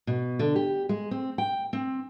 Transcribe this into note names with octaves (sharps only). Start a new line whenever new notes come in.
B2
D3
G4
G#3
C4
G5
C4